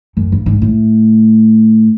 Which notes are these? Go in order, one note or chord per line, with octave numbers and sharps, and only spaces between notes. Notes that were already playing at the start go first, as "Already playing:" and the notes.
F#2
G2
G#2
A2